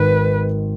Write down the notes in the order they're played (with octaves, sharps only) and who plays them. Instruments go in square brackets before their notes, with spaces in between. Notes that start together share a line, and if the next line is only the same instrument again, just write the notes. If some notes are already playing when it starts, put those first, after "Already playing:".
Already playing: [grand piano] G#1 G#2 D#3 [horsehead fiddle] B4